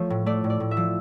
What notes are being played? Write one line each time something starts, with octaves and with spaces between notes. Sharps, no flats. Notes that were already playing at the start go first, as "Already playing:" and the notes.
Already playing: F3 A3 C#5
A2
A3 D5
A2
D5
A2
E5
F3